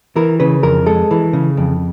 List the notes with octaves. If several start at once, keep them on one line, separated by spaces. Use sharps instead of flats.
E3 A#4
C#3 B4
F2 A#4
G#3 A4
E3
C#3
F2